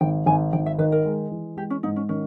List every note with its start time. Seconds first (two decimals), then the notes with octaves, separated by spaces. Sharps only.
0.01 G#1 G5
0.26 G#1 G#5
0.53 G#1 G5
0.66 E5
0.78 D#3 B4
0.92 A#4
1.05 G#3
1.31 E3
1.57 G#3 G4
1.70 C#4
1.83 G#2 D#4
1.96 C#4
2.09 D#3 C#4